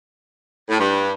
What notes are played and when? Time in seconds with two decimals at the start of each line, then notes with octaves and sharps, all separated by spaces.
0.69 A2
0.79 G2